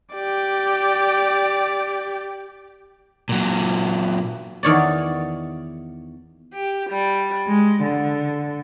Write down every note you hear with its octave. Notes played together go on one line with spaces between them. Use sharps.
G4 D5
A#2 F#3
E2 D#3 C#5 D5
G4
G3
G#3
D3